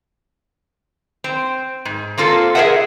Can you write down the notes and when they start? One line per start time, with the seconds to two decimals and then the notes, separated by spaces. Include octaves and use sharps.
1.24 C4
1.85 G#2
2.18 A#3 C4 F4 A4
2.55 G#4 A#4 C5 D#5 E5 F#5